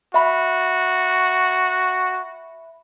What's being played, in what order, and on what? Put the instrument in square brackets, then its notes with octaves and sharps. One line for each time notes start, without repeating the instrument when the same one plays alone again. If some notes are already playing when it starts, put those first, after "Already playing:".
[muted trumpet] F#4 [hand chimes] E5 B5